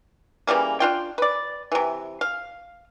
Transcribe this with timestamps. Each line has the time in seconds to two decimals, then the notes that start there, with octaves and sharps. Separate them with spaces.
0.47 C#3 E3 G3 A#3
0.80 D4 F4 G5
1.18 B4 D5
1.72 C3 E3
2.21 F5